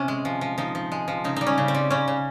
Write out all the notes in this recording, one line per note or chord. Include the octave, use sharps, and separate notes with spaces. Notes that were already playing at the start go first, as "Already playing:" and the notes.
Already playing: C3 C#4
G#3
F3
F3
F3 D#4
F3
G#3
F3
C#3 D#4
G3 D#4
C#4
C#3
C4
G3
C#3 C#4
C#3